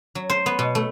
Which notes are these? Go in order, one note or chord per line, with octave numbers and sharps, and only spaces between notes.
F#3
C5
B3
B2
A3